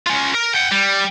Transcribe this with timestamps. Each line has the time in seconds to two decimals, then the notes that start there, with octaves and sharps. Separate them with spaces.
0.06 C#4 F4
0.34 A#4
0.54 F#5 G5
0.71 G3